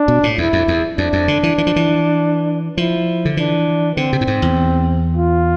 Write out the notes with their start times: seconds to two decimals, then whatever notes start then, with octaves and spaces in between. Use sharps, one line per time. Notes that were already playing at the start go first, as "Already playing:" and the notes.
Already playing: D4
0.08 B2
0.23 A2
0.38 E2 E4
0.53 F2
0.68 E2
0.97 F2 D4
1.13 F2
1.28 D3
1.43 E3
1.58 E3
1.67 F3
1.76 E3
2.77 F3 E4
3.25 D3
3.37 E3 D4
3.97 D3 C4
4.13 C3
4.21 A2
4.27 G#2
4.42 E2
5.17 F4